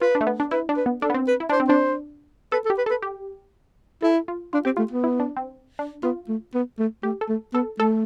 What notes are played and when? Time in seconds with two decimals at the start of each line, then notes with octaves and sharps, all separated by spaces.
0.01 F4 B4
0.15 D4
0.21 A3
0.27 B3
0.40 D4
0.51 E4 B4
0.69 D4
0.77 B4
0.86 B3
1.02 D4 A4
1.10 B3
1.14 C4
1.27 B4
1.40 E4
1.49 D4 C5
1.60 C4
1.68 D4 C5
2.52 A4 B4
2.65 A4
2.70 G4
2.78 B4
2.86 A4
2.90 B4
3.02 G4
4.02 E4 A4
4.28 F4
4.53 D4 F4
4.65 C4 G4
4.77 A3 F4
4.91 B3
5.04 E4
5.20 D4
5.36 C4
5.79 D4
6.03 B3 F4
6.28 A3
6.54 B3
6.79 A3
7.03 A3 G4
7.21 A4
7.29 A3
7.54 B3 A4
7.79 A3 A4